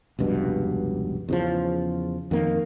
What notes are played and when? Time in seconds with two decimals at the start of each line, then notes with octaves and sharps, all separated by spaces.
0.19 F1 C#2 G2 B2
1.29 E2 C#3 F3
2.31 F2 D#3 A#3